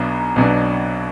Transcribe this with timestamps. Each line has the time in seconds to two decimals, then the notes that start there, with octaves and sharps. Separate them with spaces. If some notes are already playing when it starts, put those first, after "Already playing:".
Already playing: B1 B2 F#3 B3 D4
0.36 B1 B2 F#3 B3 D4